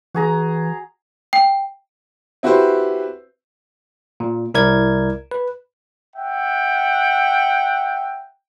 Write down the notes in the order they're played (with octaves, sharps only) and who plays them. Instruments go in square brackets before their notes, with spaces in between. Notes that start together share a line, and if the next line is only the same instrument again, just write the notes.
[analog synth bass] E3 [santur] F#4 G#4 A#5
[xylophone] G5
[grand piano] C4 E4 F#4 G4 B4 C5
[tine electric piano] A#2
C2 E4 A#4 D5 G#6
B4
[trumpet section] E5 F#5 G5